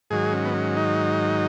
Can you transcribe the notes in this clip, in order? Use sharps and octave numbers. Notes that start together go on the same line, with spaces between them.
G#2 D#3 F#3 G#4
C#4
B3
C#4
D#4